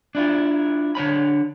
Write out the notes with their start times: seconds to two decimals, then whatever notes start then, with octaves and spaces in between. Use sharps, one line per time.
0.15 D4 E4 F4
0.95 D3 D4 C#5 B5